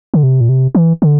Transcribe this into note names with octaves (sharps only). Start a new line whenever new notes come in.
D3
C3
A#2
C3
E3
D3